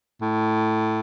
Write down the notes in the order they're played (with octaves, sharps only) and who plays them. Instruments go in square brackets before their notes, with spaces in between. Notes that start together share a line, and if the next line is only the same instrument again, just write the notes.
[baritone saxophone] A2